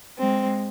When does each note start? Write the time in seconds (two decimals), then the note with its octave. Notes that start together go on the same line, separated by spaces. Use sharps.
0.19 G#3 C4